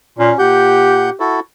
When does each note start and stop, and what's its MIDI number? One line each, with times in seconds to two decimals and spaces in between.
0.18 0.33 46
0.18 0.38 61
0.39 1.10 46
0.39 1.17 67
0.39 1.10 78
0.39 1.10 91
1.20 1.40 64
1.20 1.40 66
1.20 1.40 69